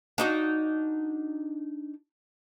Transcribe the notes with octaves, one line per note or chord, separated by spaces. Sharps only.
D4 D#4 F#4